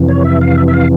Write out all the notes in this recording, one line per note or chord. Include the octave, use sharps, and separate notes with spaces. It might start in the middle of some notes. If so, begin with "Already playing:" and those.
Already playing: F2 C3 E3
C#5
E5
F5
E5
E5
F5